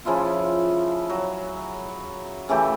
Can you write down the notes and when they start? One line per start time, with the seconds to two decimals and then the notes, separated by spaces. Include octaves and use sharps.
0.05 C#3 F3 E4 F4
1.09 F#3
2.49 C#3 E3 A3 G4